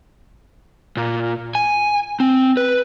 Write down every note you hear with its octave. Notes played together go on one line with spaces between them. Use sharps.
A#2
G#5
C4
B4